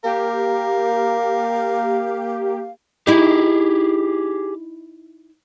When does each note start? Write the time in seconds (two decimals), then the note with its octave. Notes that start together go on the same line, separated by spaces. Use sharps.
0.04 A#3 G4 A#4 F5
3.07 D#4 E4 G4 G#4